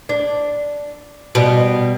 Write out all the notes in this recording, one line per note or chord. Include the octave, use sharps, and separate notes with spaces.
D4
B2 G3